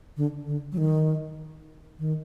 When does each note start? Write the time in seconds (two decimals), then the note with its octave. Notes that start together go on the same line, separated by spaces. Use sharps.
0.17 D3
0.47 D3
0.72 F#3
0.78 D#3
1.99 D#3